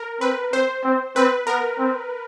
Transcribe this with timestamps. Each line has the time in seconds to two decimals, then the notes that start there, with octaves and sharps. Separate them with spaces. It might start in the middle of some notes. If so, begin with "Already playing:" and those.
Already playing: A#4
0.21 C4 B4
0.53 C4 C5
0.84 C4
1.16 C4 B4
1.47 B3 A#4
1.79 C4